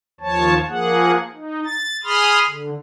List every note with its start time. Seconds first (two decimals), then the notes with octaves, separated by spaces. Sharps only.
0.21 D#2 F3 C#5 A5
0.68 F3 A#3 G#4 F#5
1.33 D#4
1.65 A6
2.03 G#4 B5 C6 D#6 F6
2.49 D3